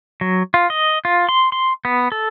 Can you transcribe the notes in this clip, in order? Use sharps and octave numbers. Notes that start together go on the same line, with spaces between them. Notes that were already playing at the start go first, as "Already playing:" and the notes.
F#3
F4
D#5
F4
C6
C6
B3
A4